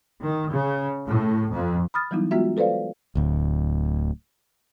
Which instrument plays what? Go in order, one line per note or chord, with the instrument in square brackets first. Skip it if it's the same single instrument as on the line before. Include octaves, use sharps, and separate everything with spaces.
[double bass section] D#3
C#3
A2
F2
[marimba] B5 D#6 F6 A6
E3 F#3 G3 B3 D#4 E4
G#3 B3 F4 F#4 E5
A4 B4 C5 D5 F5
[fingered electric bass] D1 D2